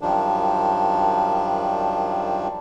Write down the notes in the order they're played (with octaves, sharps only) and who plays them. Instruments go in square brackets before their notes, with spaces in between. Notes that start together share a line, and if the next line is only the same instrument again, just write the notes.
[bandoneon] F#2 D#3 F3 G3 D4